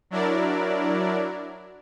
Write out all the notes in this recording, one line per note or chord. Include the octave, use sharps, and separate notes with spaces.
F#3 D4 E4 A#4 D5